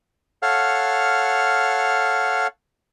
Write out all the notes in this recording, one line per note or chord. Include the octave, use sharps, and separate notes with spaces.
A4 C#5 F5 F#5 F6